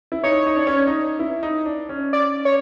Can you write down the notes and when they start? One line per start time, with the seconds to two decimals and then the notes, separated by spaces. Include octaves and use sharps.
0.12 E4
0.23 D#4 C#5
0.46 D#4
0.56 D4
0.67 C#4
0.78 D4
0.87 D#4
1.19 E4
1.43 D#4
1.66 D4
1.89 C#4
2.13 D5
2.45 C#5